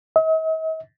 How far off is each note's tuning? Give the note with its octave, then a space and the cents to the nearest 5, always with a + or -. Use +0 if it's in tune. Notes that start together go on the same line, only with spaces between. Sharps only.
D#5 +45